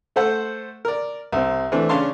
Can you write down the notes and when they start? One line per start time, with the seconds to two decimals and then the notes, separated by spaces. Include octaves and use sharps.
0.16 A3 A4 C5 F#5
0.85 A#4 D5
1.32 C2 C4
1.72 E3 A3 C4 D4
1.89 C#3 C#4 D4 F5 A5 C6